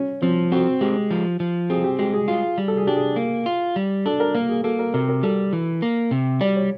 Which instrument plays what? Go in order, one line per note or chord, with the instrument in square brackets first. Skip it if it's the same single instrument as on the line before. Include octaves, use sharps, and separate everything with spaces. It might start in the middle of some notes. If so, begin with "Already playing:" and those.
Already playing: [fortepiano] C#4
[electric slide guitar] F3 [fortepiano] C4
[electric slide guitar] C4 [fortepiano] F#4
[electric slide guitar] G#3 [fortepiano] G4
[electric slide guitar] F3
F3
[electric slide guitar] C4 [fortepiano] G#4
[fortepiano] G4
[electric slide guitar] G#3 [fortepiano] G4
[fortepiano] G#4
[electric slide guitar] F4 [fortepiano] G#4
[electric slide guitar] G3
[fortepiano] A4
G#4
[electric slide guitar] D4 [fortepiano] G4
[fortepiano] G#4
[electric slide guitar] A#3
F4
G3
[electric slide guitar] D4 [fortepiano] A4
[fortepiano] A#4
[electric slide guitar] A#3 [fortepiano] A#4
[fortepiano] G#4
[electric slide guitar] A#3 [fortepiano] A4
[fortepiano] A#4
[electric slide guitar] C3 [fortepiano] A#4
[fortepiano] A#4
[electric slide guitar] G3 [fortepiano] A4
[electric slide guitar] E3
A#3
C3
[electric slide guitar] G3 [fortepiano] D5
[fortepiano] C#5